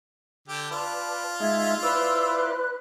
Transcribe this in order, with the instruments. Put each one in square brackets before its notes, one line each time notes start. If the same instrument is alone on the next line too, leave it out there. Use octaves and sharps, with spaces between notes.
[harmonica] D3 G4 [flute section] A5
[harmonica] F4 [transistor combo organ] B4 D5
[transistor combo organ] G#3 D#4 [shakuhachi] E5 [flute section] G#6
[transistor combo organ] E4 C5 D5 [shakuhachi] B4 [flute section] E6
[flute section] F#6